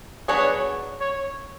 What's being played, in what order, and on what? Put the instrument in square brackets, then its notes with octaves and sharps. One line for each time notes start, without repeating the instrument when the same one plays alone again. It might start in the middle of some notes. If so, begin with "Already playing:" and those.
[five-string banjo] F#3 B3 D4 G#4 B4 [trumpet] C#5
[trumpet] C#5